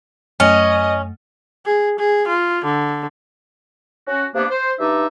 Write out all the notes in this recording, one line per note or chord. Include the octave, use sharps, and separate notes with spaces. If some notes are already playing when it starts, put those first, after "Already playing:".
F#2 A3 C#4 D#5
G#4
G#4
F4
D3
C#4 F#4
C3 A#3 B3 D4
C5
G2 D#4 D5 E5